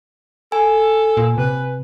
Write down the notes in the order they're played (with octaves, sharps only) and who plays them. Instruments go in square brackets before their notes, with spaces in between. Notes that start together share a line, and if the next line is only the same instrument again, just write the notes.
[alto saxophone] A4 [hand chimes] G#5
[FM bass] A#2
[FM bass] C3 [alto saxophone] B4